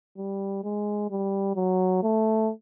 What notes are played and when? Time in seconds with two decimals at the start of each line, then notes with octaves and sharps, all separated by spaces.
0.18 G3
0.63 G#3
1.11 G3
1.56 F#3
2.03 A3